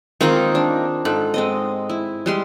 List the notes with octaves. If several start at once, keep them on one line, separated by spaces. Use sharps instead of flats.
D#3 G#3 A#3 C4 D#4 F4
D4
G#2 A4
G#3 C4 D#5
E4
G3 G#3 C6